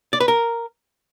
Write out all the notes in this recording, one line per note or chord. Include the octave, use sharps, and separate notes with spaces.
D5
B4
A#4